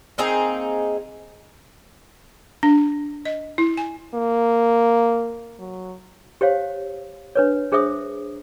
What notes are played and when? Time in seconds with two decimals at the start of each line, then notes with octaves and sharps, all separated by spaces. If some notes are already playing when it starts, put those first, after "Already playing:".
0.18 A#3 C4 D#4 G#4
2.63 D4
3.25 D#5
3.58 E4
3.77 G#5
4.15 A#3
5.59 F#3
6.41 G4 C5 C#5 F5
7.35 D4 B4 C#5
7.72 D4 G#4 C5 E5 D#6